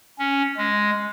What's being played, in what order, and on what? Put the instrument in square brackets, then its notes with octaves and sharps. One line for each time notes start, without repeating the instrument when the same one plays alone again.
[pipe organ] C#4
G#3